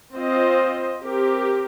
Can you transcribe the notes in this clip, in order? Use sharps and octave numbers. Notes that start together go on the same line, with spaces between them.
C4 F4 C5 D#5
C4 G4 A#4